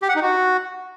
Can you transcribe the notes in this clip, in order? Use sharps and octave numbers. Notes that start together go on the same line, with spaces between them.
G4
F#5
D#4
F#4